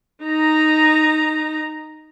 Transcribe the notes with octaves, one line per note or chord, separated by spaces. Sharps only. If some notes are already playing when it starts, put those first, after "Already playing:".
D#4 A#5